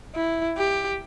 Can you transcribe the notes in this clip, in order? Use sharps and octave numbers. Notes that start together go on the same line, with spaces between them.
E4
G4